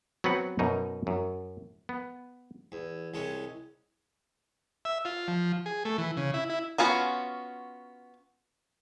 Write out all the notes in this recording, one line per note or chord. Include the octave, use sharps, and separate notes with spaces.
F#3 B3 C4 B4 F#5
F#2 B2 D#4
F#2
B3
E2
C2 G#3 C#4
E5
F4
F3
G#4
A3
E3
C#3
E4
E4
B3 C#4 F4 F#4